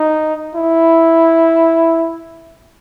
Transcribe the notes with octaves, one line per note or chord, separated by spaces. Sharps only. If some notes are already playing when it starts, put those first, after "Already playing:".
Already playing: D#4
E4